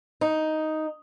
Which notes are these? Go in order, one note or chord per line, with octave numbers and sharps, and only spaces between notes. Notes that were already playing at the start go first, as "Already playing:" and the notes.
D#4